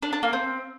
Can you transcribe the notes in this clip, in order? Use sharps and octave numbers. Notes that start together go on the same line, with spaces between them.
D4
D4
A#3
C4